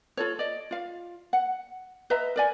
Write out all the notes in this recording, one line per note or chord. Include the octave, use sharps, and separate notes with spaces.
F4 A4 C#5
D5 D#5
F4 F5
F#5
B4 D#5 E5 A#5
A#4 D5 G#5